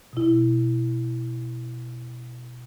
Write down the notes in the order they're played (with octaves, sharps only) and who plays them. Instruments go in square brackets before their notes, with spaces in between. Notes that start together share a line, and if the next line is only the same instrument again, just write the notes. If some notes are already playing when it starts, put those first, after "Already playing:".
[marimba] B2 E4